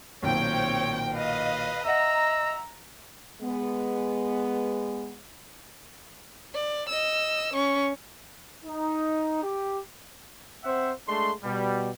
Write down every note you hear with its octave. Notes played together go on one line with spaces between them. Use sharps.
B1 A#2 D#3 C4 C#5 G5
B4 D#5 F5
D#5 E5 F#5 A#5 E6
G#3 B3
D5
D#5 E6
C#4 C#6
D#4
G4
C4 C5 E5 F#5
G#3 A3 D4 C6
B2 G3